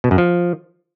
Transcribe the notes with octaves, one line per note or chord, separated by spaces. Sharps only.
B2
F#2
F3